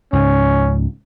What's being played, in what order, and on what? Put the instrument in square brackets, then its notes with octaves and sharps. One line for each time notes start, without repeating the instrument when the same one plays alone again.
[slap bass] C#2 G#2 [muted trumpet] C#4